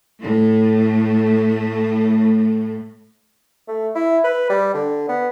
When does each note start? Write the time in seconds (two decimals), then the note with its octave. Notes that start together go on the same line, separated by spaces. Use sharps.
0.22 A2 A3
3.68 A3
3.95 E4
4.24 B4
4.49 G3
4.74 D3
5.08 B3